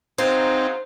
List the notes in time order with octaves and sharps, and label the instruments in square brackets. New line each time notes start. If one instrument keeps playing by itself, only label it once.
[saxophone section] G#2 F#3 F5 [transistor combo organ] C4 D#4 [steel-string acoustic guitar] C5